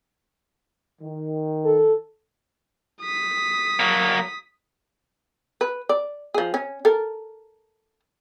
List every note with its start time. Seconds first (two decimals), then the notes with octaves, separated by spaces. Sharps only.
1.00 D#3
1.65 A4
3.01 D#6 B6
3.79 F#3 A#3
5.61 B4
5.89 D5
6.34 F3 G#4
6.54 C#4
6.85 A4 A#4